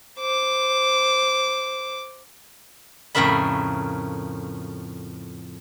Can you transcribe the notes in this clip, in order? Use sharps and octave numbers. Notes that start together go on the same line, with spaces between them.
C5 D6
F2 A2 C#3 A#4 E5 B5